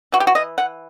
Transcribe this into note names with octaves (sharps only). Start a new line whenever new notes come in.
E3 F#4
G4
F#4
E3 D#5
E3 F#5